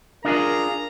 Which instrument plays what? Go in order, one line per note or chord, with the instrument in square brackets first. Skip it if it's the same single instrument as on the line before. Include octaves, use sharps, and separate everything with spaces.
[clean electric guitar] D4 F4 G#4 [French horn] A#4 [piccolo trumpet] A#5